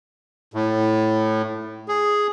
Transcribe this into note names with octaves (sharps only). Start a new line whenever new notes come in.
A2
G#4